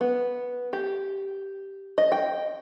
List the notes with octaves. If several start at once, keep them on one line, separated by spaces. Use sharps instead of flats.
B3
G4
D#5
G5